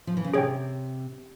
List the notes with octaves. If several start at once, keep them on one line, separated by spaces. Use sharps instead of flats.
F3
E3
C#3
C3 G#4 C#5 G5